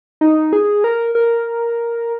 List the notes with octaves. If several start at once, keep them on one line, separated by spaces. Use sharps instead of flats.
D#4
G#4
A#4
A#4